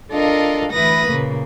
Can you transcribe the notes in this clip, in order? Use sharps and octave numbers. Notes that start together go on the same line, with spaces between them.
D4 F4 A4 A#4 D#5 F5
D2 E3 E4 B4 D#6 A#6
A#2 C#3 A#3